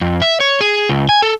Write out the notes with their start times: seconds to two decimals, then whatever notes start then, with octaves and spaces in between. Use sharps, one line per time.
0.01 F2
0.22 E5
0.40 C#5
0.61 G#4
0.89 C#2
1.09 G#5
1.22 A4